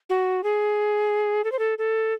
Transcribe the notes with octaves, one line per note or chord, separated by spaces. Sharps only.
F#4
G#4
A4
C5
A4
A4